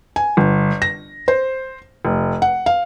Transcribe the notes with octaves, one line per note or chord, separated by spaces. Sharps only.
G#5
G1
A#6
C5
F1
F#5
F5